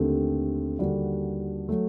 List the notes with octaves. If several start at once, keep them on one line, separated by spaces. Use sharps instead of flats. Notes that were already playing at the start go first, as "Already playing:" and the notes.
Already playing: D#2 D3 A3 C4 G4
D#2 D3 G3 D4 F#4
F#3 A3